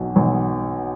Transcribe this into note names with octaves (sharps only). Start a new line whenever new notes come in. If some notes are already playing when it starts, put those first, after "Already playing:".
Already playing: B1 B2
B1